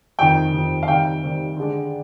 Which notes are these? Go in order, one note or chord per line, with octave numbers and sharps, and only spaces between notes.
F2 C3 D#3 G5
F2 C3 D#3
F5
C3 D#3 G3 G5
C3 D#3 G3
D3 G#3 D4